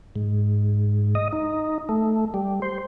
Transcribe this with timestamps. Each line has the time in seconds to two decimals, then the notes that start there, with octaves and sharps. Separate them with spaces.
0.16 G#2
1.15 D#5
1.33 D#4
1.89 A3
2.34 G3
2.62 C5